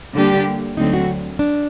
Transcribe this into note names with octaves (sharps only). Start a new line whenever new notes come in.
D3 G3 A#3 D4 G4
D2 D3 F#3 C4 D#4
F#4
D4